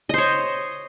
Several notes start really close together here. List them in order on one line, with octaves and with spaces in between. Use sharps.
D#5 C5 C#5